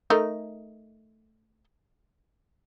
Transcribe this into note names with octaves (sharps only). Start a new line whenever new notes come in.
A3 D#4 A#4